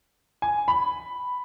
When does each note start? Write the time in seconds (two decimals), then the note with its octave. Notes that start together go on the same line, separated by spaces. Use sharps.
0.42 G#5
0.68 B5